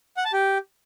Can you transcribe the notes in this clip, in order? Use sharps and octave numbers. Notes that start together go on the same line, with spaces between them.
F#5
A5
G4